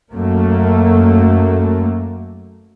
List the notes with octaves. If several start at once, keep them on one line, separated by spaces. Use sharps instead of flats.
F#2 A3 A#3